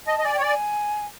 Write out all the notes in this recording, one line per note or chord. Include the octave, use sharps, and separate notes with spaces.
D#5 A5
D#5
D5 G#5
C#5 G5
D5 G#5